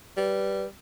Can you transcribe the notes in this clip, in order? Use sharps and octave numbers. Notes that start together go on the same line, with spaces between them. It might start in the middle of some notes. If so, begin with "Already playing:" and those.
G3 B4